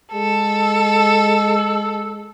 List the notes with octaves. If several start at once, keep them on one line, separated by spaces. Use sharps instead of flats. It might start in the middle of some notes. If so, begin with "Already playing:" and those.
G#3 A4
E6